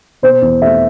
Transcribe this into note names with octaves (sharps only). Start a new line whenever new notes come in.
B2 C5
E2
A3 E5